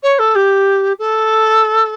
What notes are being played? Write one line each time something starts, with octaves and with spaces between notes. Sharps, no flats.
C#5
A4
G4
A4